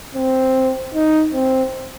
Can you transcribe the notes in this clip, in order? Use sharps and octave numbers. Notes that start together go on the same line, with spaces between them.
C4
D#4
C4